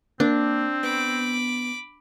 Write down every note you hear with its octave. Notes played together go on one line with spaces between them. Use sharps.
A#3 C4 D4
B3 B5 D6